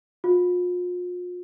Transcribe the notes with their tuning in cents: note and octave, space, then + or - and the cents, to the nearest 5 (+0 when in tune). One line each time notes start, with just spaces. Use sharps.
F4 +40